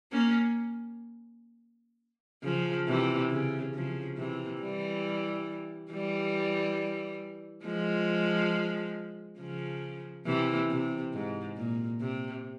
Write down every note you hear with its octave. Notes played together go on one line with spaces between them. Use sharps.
A#3 C#4
C#3 F3
C3 E3
C#3
C#3 F3
C3 E3
E3 G3
E3 G3
F3 G#3
C#3 F3
C3 E3
C3
G#2
A#2
C3